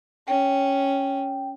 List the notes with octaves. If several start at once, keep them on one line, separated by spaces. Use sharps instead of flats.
C#4 G5